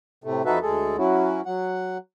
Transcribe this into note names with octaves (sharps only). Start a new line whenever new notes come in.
A2 C3 A3
F2 D#4 F#4 A4 B4 E5
D2 G#3 G#4 A4
F#3 C#4 E4 F#4
F#3 F#5